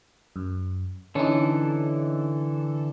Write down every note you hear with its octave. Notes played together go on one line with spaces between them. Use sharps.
F#2
D3 E3 C#4 D#4 A4